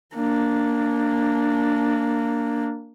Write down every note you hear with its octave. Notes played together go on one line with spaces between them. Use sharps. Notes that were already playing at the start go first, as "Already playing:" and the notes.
A#3 D4